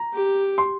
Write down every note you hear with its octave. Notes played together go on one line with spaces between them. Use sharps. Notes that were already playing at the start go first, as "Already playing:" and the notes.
Already playing: A#5
G4
C6